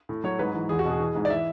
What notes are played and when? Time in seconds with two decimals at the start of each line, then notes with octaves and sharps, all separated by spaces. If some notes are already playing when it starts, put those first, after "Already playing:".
0.09 A2
0.24 F#3 C#5
0.39 G#2 B4
0.54 E3
0.69 E2 G#4
0.79 F#4
0.85 B2
0.90 G#4
1.00 E3
1.15 G#2
1.25 D5
1.30 E3 E5